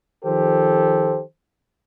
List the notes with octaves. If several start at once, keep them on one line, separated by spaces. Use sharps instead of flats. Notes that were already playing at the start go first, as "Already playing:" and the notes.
D#3 F3 G4 A4 C5